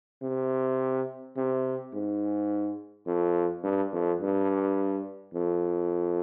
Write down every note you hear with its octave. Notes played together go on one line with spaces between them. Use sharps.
C3
C3
G#2
F2
G2
F2
G2
F2